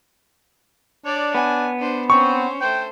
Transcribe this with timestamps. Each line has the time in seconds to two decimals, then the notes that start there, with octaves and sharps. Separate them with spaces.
1.05 D4 C#5 D5
1.35 B3 G#5
1.79 D4 C5
2.10 C4 C#4 C5 C#6
2.61 A3 C5 G5